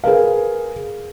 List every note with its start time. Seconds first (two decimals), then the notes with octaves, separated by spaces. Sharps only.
0.04 G#4 A#4 B4 F5